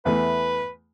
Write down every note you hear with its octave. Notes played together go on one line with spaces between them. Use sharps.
E2 E3 A3 B4